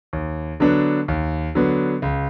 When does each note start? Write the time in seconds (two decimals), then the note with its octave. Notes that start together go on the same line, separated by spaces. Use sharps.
0.13 D#2
0.60 D3 F#3 B3 D4
1.08 D#2
1.55 D3 F#3 B3 D4
2.02 C#2